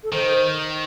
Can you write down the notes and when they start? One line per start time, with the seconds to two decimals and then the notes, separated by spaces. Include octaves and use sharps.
0.04 A4
0.12 D#3 C5